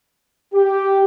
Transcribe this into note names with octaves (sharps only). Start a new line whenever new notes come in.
G4